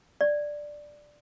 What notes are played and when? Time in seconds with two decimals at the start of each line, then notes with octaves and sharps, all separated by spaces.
0.21 D5